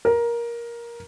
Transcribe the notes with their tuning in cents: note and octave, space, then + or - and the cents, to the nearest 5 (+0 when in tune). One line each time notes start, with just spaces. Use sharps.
A#4 +15